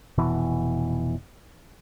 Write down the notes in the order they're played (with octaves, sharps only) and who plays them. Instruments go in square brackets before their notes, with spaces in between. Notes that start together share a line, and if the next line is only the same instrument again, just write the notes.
[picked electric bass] F1 B2 E3